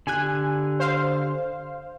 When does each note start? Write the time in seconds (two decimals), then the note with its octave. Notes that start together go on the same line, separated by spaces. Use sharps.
0.07 D3 G4 G#5 F#6
0.80 C5 F5